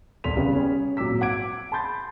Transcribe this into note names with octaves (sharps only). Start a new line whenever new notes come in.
F1 C2 C6 B6 F7
C#3 G3 B3
C#4
G#1 A#2 F#3 D6 E6 B6
F#5 D6 G#6 D7
A5 B5 C6 G6 A6